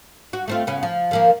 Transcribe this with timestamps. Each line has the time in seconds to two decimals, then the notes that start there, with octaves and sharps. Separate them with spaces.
0.33 F#4
0.48 A3 C4 F4
0.67 C#3 B3
0.83 F3
1.11 D#3 F3 A#3